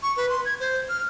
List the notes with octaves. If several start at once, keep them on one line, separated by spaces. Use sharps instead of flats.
C#6
B4
C6
G#6
C5
F6